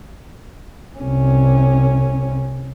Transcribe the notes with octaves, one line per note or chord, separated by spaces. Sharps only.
C2 C#4